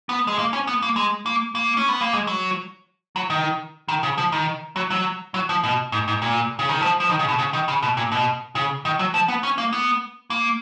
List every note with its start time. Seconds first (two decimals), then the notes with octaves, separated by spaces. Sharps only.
0.09 B3
0.27 G#3
0.39 A#3
0.53 C#4
0.67 B3
0.82 A#3
0.96 G#3
1.26 A#3
1.55 A#3
1.77 C#4
1.89 B3
2.01 A#3
2.13 G#3
2.27 F#3
3.16 F#3
3.30 D#3
3.88 D#3
4.03 C#3
4.18 F3
4.32 D#3
4.76 F#3
4.90 F#3
5.34 F#3
5.49 F3
5.64 B2
5.92 G#2
6.08 G#2
6.22 A#2
6.59 C#3
6.69 D#3
6.81 F3
7.00 F3
7.10 D#3
7.19 C#3
7.29 B2
7.39 C#3
7.53 D#3
7.68 C#3
7.82 B2
7.97 A#2
8.12 B2
8.55 C#3
8.85 D#3
8.99 F#3
9.14 F3
9.28 B3
9.43 C#4
9.58 A#3
9.73 B3
10.30 A#3